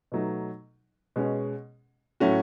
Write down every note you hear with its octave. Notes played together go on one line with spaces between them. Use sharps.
B2 F#3 A3 D#4
B2 G#3 C#4
A2 F#3 A3 C#4 F#4